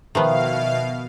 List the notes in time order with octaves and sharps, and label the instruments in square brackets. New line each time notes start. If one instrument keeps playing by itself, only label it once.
[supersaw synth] B2 F5 [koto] D#3 F3 B3 [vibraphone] E5